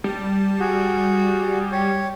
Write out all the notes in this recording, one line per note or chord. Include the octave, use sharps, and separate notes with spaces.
G3 A5
F#4 G#4
G4 C#5